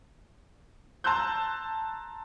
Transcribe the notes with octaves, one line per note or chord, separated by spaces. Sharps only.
A5 A#5 C6 E6 F#6 G6